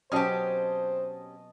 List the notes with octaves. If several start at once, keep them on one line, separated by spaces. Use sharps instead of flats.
B2 F#3 C4 C#4 G4 C5 D#5 A5